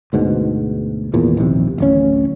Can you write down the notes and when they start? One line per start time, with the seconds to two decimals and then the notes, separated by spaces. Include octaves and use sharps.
0.13 D2 G#2 B2
1.14 G#1 E2 A#2
1.37 A#1 D#2 C3
1.78 D1 A1 C#4